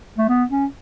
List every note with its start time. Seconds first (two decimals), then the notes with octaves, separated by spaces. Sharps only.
0.18 A3
0.28 B3
0.50 C#4